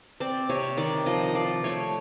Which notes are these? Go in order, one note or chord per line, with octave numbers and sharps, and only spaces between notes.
C4 D5
C3 C#5
D#3 D5
F3 D#5
F3 D5
A3 C#5